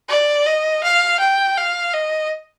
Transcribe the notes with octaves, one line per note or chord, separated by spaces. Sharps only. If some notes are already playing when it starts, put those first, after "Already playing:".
D5
D#5
F5
G5
F5
D#5